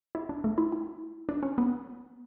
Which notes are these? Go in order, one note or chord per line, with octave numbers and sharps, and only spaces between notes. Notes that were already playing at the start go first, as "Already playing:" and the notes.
E4
D4
A3
E4
E4
D4
C#4
B3